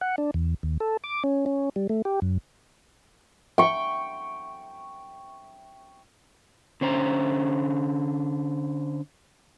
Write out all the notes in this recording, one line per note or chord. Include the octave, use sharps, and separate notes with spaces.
F#5
D4
E2
D#2
A4
D6
C#4
C#4
G3
A3
G4
F#2
G5 C#6
D3 C#4 C5 A#5